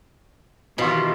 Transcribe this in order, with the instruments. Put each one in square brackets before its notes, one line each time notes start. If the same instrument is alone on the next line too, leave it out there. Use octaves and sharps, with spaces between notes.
[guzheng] B2 [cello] D#3 G4 [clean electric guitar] E3 F4